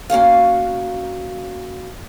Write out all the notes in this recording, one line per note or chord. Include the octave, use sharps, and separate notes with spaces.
A#3 C#4 F#4 F5